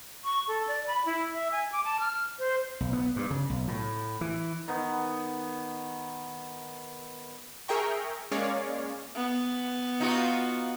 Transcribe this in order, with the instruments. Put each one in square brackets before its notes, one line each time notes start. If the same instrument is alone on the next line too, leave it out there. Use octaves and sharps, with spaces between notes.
[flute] C#6
A4
D5
B5
E4
E5
G#5
D6
A5
F6
C5
[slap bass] B1
B3
G2
C#3
B1
A2
E3
[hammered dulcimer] D#3 B3
[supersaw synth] G#4 A#4 E5 G5 A#5 C#6
G#3 A#3 C#4 C#5 D5 F5
[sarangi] B3
[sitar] D#4 F4 F#4